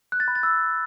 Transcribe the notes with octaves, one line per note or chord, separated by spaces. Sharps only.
F#6
A6
B5
A6
E6